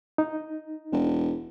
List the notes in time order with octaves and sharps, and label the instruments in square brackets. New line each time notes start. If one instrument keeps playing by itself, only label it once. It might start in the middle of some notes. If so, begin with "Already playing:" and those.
[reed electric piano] D#4
[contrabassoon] E1